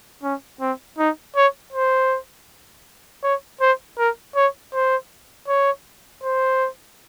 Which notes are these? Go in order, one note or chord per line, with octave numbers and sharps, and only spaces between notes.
C#4
C4
D#4
C#5
C5
C#5
C5
A#4
C#5
C5
C#5
C5